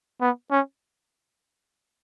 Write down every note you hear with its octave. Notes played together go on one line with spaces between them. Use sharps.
B3
C#4